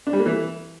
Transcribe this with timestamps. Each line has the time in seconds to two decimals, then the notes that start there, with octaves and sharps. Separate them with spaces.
0.07 D4
0.13 G3
0.19 A#3
0.26 E3